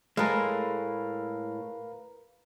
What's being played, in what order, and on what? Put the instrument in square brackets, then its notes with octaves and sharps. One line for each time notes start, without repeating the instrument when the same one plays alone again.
[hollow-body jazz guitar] A2 G#3 [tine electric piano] A#4 B4 F5